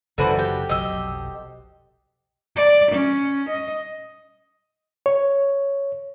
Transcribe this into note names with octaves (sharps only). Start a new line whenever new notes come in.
F#1 F#2 D3 E3 F#4 A4 C5 F#5
G4
F1 B1 F#3 D#5 E6
D5
C#4
D#5
C#5